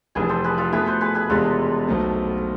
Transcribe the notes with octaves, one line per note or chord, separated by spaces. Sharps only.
F1 F2 E3 G#4 B4
A4 C5
G#4 B4
F4 A4
B2 A3 E4 G#4 B4
A4 C5
G#4 B4
G#4 B4
E1 E2 C3 G#3 F4 A4
B1 B2 A3 C4